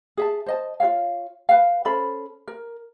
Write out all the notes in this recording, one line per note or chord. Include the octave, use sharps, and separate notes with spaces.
G#4 E5 A5
C5 D#5 A5
F4 A#4 C#5 F5
B4 F5
C#4 A4 C5 B5
A#4